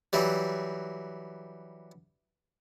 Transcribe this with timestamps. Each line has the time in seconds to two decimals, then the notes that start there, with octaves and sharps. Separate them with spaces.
0.13 E3 F#3 G3